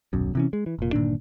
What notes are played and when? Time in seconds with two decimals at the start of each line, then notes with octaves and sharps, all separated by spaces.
0.13 D#1 B1 F#2
0.35 C3 E3 C#4
0.53 G#3
0.66 E3
0.79 F1 A#2
0.93 G1 A#2 D#3 D4